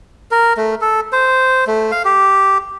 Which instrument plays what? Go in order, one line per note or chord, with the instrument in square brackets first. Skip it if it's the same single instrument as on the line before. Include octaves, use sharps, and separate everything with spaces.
[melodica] A#4
A3
A4
C5
A3
F5
G4